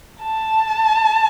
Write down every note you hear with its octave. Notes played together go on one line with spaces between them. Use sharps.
A5